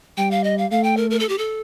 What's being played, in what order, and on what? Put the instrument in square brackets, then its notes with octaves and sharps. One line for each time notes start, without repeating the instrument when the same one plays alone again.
[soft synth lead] G3 [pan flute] G5
[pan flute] F5
D#5
F5
[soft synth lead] A3 [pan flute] F5
[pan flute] G5
A#4
A#4
A4
G4
A4